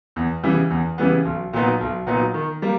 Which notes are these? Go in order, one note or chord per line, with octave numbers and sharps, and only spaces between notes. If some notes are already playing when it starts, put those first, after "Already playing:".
E2
C#3 E3 G3 B3
E2
C#3 E3 G3 B3
B1
A#2 F#3 B3 D#4
B1
A#2 F#3 B3 D#4
D#3
G3 A#3